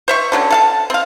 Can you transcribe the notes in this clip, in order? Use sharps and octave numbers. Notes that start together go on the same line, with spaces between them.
C5 E5 C#6
D3 F#3 C4 C#4
A4 F5 A5
C4 F5